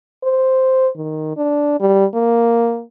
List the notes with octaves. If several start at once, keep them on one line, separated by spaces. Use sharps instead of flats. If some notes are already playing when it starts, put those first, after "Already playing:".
C5
D#3
D4
G3
A#3